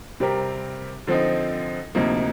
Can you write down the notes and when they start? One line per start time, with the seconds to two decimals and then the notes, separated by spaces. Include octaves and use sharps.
0.20 C3 G3 C4 G4 A#4
1.07 D3 F3 C4 D#4
1.95 D2 C3 F3 A#3 D#4